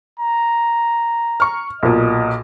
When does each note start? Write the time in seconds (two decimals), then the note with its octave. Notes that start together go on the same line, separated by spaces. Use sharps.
0.20 A#5
1.40 C#6 F6
1.83 B1 A#2 D#5